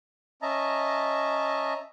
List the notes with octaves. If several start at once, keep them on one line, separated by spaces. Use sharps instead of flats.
C#4 D#5 E5 A5 A#5